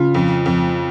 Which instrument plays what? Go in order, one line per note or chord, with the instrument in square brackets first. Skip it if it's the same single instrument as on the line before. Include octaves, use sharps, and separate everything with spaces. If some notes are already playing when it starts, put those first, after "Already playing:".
Already playing: [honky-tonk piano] C#3 [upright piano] F4
[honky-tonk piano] F2
F2